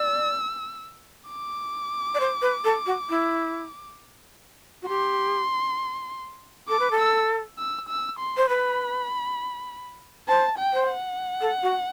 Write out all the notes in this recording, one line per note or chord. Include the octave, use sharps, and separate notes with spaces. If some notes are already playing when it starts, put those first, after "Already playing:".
Already playing: D5 E6
D6
D5
C5
B4
A4
F#4
E4
F#4
G4 C6
A4 D6
B4
A4
E6
E6
E6
C6
C5
B4 B5
C5 A5
G5
C5
F#5
A4
F#4